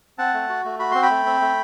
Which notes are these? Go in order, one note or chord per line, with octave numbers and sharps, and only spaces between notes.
C4 F#5 A5
A3
F#4
A3
F#4 B5
C4 C6
G5 B5
A3
C4
A3